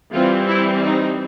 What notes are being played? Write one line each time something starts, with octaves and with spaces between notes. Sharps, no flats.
E3 G3 C4 F4
E4
D#4